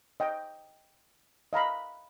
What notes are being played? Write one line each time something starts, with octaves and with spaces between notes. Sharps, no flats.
D#5 G5
D#5 F5 A#5 B5